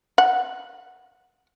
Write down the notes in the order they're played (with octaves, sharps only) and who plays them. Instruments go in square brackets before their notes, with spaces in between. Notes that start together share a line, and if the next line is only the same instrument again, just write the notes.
[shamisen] F#5